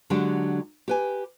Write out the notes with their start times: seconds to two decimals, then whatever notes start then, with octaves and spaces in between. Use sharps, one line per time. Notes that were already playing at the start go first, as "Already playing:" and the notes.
0.10 D3 F#3 G#3 D4 G4
0.88 G4 B4 G#5